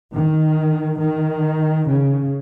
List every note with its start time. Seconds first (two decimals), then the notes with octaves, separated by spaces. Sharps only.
0.13 D#3
0.99 D#3
1.87 C#3